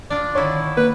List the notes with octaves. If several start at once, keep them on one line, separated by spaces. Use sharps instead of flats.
D4 F4 D5
D3 D#3 E4 C#5
A#3 B4